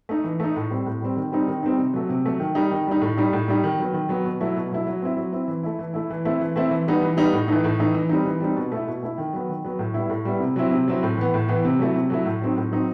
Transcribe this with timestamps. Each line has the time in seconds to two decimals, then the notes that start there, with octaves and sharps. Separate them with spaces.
0.09 A3 D#4
0.24 E3
0.40 A3 D#4
0.56 A2
0.70 G3 C4
0.86 A2
1.02 G3 C4
1.17 D#3
1.32 G3 C4 D#4
1.47 D#3
1.63 G3 C4 D#4
1.78 C3
1.94 F#3 A3
2.09 C3
2.26 F#3 A3
2.40 D#3
2.55 G3 D#4
2.71 D#3
2.87 G3 D#4
3.01 A2
3.18 G3 D#4
3.33 A2
3.48 G3 D#4
3.64 D#3
3.79 F#3 B3
3.94 D#3
4.09 F#3 B3
4.25 B2
4.41 F#3 A3 E4
4.56 B2
4.71 F#3 A3 E4
4.87 F#3
5.02 C4 E4
5.17 F#3
5.32 C4 E4
5.48 E3
5.63 A3 E4
5.79 E3
5.94 A3 E4
6.10 E3
6.25 A3 C4 E4
6.41 E3
6.56 A3 C4 E4
6.71 E3
6.87 G3 B3 D#4
7.02 E3
7.17 G3 B3 D#4
7.33 A2
7.48 E3 A3 D#4
7.64 A2
7.79 E3 A3 D#4
7.94 E3
8.09 G3 C4 D#4
8.26 E3
8.40 G3 C4 D#4
8.56 B2
8.72 A3 E4
8.87 B2
9.03 A3 E4
9.18 D#3
9.33 F#3 B3
9.49 D#3
9.65 F#3 B3
9.79 A2
9.94 G3 B3 E4
10.10 A2
10.25 G3 B3 E4
10.40 C3
10.56 F#3 C4 E4
10.71 C3
10.88 F#3 C4 E4
11.03 A2
11.17 E3 B3
11.34 A2
11.48 E3 B3
11.65 C3
11.79 F#3 A3 E4
11.95 C3
12.10 F#3 A3 E4
12.26 A2
12.42 F#3 C4 D#4
12.57 A2
12.71 F#3 C4 D#4